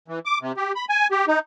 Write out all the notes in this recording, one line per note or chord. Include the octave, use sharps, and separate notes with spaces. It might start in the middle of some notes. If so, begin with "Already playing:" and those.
E3
D6
C3
G4
B5
G#5
G4
D#4